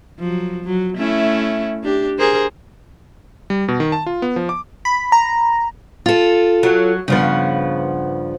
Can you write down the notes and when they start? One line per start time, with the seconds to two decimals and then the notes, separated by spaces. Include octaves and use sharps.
0.19 F3 F#3
0.64 F#3
0.97 A3 C#4 E4
1.83 D4 G4
2.18 G#4 A#4 C5
3.50 G3
3.68 B2
3.80 D#3
3.92 A5
4.06 F4
4.22 B3
4.36 F3
4.49 D6
4.85 B5
5.12 A#5
6.06 F4 A4
6.63 F#3
7.08 G2 C#3 F3 B3